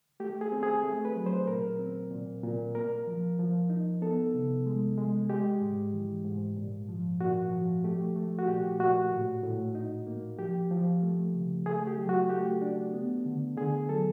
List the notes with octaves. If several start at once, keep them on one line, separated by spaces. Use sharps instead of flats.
A3 G4
G#4
C4
G#4
A3
B4
F#3
C5
A#2 A#4
C4
A#2
A#2
A#3 A#4
F3
F3
D#4
B3 A4
C3
G#3
G#3
G#3 G4
G#2
E3
G#2
A#2
F3
A#2 F#4
F3
A3 G4
A3
F#4
A#2 G4
A#2 F#4
A2
A2
D#4
A#3
F3 G4
F3
A3
C#3
A3 G#4
G4
F#3
F#4
A3 G4
D4
B3
D3
D3 G#4
F#3 A4